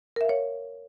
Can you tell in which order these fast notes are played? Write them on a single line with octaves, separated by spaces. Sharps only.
A#4 E5 F5 C#5